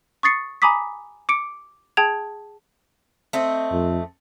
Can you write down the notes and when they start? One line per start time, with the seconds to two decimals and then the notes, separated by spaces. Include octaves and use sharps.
0.23 C#6 D#6 A6 C7 C#7
0.62 G#5 A#5 B5 D6 D#6 B6
1.29 D6 C#7 D7
1.97 G#4 G5 A5 G#6 F7
3.33 A3 C4 D#5
3.72 F2